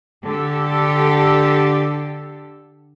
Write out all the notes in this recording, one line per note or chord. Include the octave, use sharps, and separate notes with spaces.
D3 G4 A4